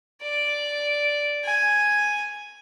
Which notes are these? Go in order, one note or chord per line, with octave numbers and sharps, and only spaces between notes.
D5
G#5